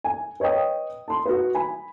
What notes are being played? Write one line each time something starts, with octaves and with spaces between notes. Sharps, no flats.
G#5
B4 C#5 D#5 G5 D#6
A5 C6
F#4 B4
G#5 B5